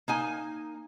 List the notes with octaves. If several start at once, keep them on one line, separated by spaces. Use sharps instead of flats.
A#3 D#4 G#5